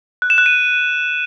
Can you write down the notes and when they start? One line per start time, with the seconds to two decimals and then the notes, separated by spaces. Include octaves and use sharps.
0.22 F#6
0.30 E7
0.38 F#6
0.46 D#7